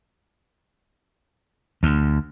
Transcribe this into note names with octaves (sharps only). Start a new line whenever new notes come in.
D2